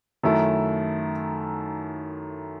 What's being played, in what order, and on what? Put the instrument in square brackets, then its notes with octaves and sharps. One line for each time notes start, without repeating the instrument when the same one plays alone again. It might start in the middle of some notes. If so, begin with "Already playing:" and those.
[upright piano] F#2 D#3 A3 E4 A4